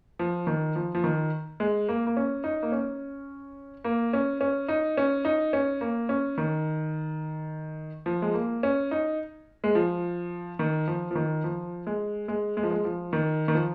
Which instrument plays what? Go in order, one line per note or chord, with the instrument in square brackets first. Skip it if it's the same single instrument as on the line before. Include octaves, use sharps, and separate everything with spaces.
[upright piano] F3
D#3
F3
F3
D#3
G#3
A#3
A#3
C#4
D#4
A#3
C#4
A#3
C#4
C#4
D#4
C#4
D#4
C#4
A#3
C#4
D#3
F3
G#3
A#3
C#4
D#4
G#3
F3
D#3
F3
F3
D#3
F3
G#3
G#3
G#3
F3
G#3
F3
D#3
D#3
F3